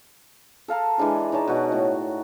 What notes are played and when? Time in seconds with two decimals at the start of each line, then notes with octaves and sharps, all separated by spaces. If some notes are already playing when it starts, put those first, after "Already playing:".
0.68 A4 F5 A5 A#5
0.98 E3 G#3 D4 G#4
1.32 D#4 C#5 D5 A5
1.47 B2 F#4 F#5
1.72 A2